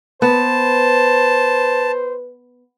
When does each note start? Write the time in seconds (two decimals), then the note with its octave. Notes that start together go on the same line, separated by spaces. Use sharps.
0.22 B3 B4 C5 A5